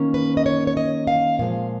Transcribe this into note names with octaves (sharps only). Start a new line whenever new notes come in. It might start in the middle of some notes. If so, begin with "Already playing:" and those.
Already playing: D#3 A#3 C#4
B4
D#5
C#5
C#5
D#5
F5
A#2 F3 G#3 F5